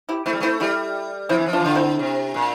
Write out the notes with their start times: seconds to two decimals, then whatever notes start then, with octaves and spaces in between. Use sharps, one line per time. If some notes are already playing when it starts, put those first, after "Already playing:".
0.09 E4 G4
0.26 A3 C4 E4
0.33 G3
0.40 A3 C4 E4
0.60 G3 E4 G4
1.29 F3 C4 E4
1.38 E3
1.46 F3
1.53 D4 F4
1.60 E3
1.64 D3 F4
1.75 C4 E4
1.99 C3
2.34 A#2